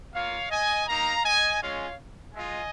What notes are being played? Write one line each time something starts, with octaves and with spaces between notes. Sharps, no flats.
A#3 F4 C#5 F5
D#5 G#5
A#3 D#4 F5 A#5
D#5 G#5
G#3 C#4 F4 C#5 F5
G#3 F4 D#5 G#5